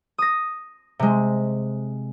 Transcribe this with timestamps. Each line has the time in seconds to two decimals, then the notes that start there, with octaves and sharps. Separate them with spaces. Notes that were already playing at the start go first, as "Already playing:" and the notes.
0.18 D#6 A#6
0.99 C3 G#3